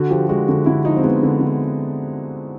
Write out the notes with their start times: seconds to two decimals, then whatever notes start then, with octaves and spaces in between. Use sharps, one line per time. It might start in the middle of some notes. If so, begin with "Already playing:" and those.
Already playing: D3 F#4
0.10 F3 G4
0.29 G#3 F#4
0.48 D3 F#4
0.66 D3 E4
0.85 F3 D#4
0.97 C4
1.03 G#3 B3
1.23 D3
1.41 D3